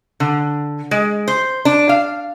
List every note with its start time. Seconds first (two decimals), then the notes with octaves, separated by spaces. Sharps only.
0.20 D3
0.91 G#3
1.28 C5
1.65 D4
1.89 F5